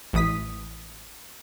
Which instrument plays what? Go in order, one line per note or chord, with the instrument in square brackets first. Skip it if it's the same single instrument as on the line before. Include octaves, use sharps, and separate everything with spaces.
[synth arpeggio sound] A1 E3 D#6 B6